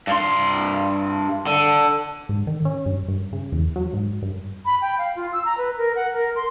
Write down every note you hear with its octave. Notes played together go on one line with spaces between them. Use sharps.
G2 C6
D3
G#2
D#3
C#4
G2
G2
C#3
E2
F#3
G#2
G2
B5
G5
F5
F4
E6
A#5
B4
A#4
F#5
A#4
C6